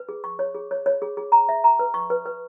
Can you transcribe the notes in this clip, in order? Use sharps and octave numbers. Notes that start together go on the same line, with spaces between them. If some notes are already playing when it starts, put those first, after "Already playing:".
Already playing: B4
G#4
C#6
C#5
G#4
C#5
C#5
G#4
G#4
A#5
E5
A#5
B4
C#6
B4
B4